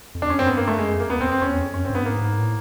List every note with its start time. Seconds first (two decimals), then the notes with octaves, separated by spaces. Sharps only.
0.15 F2
0.22 E2 D4
0.30 F2 C#4
0.39 F#2 C4
0.46 G2 B3
0.57 A#3
0.68 A3
0.78 F#2 G#3
0.94 F2
1.00 A#3
1.10 E2 B3
1.20 E2 C4
1.26 F2
1.32 C4
1.42 C#4
1.48 E2
1.61 F2
1.74 F#2 C#4
1.85 C4
1.90 G2 B3
2.05 G#2 A#3
2.21 G#2
2.38 A2